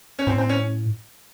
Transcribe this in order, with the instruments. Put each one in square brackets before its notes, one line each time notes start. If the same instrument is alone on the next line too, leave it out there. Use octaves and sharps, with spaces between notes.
[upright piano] C#4
[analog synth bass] A2 [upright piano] C4
[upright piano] C4
C#4